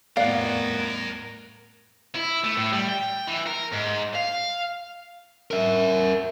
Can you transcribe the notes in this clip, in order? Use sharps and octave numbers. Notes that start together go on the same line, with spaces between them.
F2 A2 B3 A#4 D5 F5 F#5
E4
A3
A2
G3
G5
E3
A#4
G#2
F5
A#4 E5